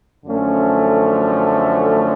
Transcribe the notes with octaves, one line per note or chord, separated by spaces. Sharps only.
F#2 D3 F3 A3 C#4